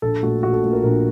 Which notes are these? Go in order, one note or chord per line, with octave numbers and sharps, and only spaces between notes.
A#1 A4
A#2 A3 F#4
A#1 F#4
A4
A#2 A3
A#4
A#1 A#4